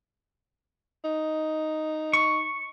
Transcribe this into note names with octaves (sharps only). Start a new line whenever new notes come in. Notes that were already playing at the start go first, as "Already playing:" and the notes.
D#4
C#6